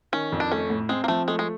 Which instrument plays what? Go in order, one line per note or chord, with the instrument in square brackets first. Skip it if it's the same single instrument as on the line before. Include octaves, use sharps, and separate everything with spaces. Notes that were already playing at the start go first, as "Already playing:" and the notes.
[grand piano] D#3 [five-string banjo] C#4
[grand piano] F2
[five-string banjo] D4
[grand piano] A3 [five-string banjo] C#4
[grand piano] A2
[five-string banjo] G#3 [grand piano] C4
[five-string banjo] A#3
[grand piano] F3 [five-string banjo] A3
[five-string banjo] G#3 [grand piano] A3
[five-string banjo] G#3